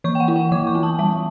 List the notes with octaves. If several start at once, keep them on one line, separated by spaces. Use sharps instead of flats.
E3 C#6
G5
F#5
E4
G5
E3 D6
C#6
B3
A5
G3 A5